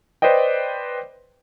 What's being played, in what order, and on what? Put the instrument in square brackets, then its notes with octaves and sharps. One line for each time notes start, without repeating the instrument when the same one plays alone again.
[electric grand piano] B4 C5 D5 D#5 G5